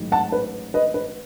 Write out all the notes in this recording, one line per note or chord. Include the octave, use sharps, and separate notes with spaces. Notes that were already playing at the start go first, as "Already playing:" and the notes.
Already playing: A1 G#2 D#3 F#3
F#5 A5
B4
B4 D#5
B4